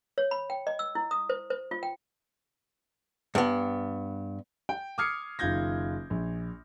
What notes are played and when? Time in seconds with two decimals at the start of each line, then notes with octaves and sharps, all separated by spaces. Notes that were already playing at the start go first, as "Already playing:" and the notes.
0.18 C#5
0.31 B5
0.50 G5
0.67 D#5
0.79 E6
0.95 E4
1.11 D#6
1.30 C5
1.50 C5
1.71 F4
1.83 G5
3.35 G2 B3
4.69 G5
4.98 D6 D#6 F6 G#6 C7 C#7
5.39 F#1 D#3 F4 G6 G#6 A#6
6.10 A#1